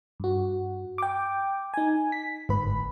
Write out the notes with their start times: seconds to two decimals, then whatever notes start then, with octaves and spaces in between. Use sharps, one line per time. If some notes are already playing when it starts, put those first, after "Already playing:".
0.20 G2 F#4
0.98 G5 D6
1.74 D#4 G#5
2.12 B6
2.49 G1 G#2 B4 B5